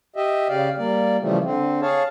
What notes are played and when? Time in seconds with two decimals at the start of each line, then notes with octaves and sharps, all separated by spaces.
0.16 G4 D#5 E5
0.49 C#3 G4 D5 F5
0.78 G3 A#3 D5
1.20 C#3 E3 F3 G3 A3
1.44 D3 C4
1.82 G#4 C#5 F5 A5